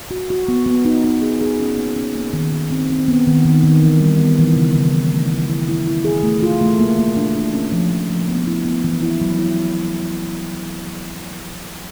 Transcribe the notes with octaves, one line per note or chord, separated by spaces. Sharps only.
F#4
F#4
B3
B3
D#4
D#4
G#4
G#4
C#4
A#3
C#4
A#3
D#3
D#3
C4
C4
B3
D#3
D#3
D#3
E3
G3
B3
E3
C#3
C#3
F#3
A3
E4
E4
E4
E4
G#4
A3
F4
A3
A#3
A#3
D4
D4
C#4
F3
F3
F3
B3
E4
B3
E3
E4
F#3
E4